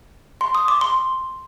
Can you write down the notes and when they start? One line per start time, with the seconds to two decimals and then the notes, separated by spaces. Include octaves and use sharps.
0.41 C6
0.55 D#6
0.68 D6
0.81 C6